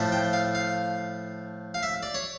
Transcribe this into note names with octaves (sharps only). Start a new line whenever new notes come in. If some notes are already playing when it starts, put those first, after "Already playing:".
Already playing: A2 F3 A3
G5
F5
F5
F5
E5
D5
C#5